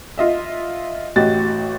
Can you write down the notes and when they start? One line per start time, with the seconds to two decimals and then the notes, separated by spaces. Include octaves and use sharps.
0.18 F4 D#5 E5
1.16 A1 F#4 G4 D#5 A6